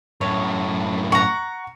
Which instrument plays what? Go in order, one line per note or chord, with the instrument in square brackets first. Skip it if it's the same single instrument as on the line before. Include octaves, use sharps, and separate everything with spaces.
[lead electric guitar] F#2 A2 [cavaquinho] C#5
[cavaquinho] F#5 A#5 [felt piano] C#6